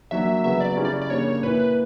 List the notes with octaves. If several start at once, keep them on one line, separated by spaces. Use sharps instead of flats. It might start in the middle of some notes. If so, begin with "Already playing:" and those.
F#3 A#3 D4 E5
C#3 F#3 B3 E5
D5
C#3 G3 C#4 E4
D5
D5
C#3 G3 A#3 D4 C#5
A#2 A#3 E4 B4